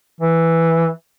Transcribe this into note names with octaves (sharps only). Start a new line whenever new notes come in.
E3